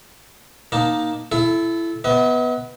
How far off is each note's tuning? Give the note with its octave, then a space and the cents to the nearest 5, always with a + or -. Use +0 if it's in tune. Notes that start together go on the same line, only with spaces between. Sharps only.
A#3 +15 D#4 +0 A5 +0
E4 +20 A4 -20
B3 +0 D#5 +45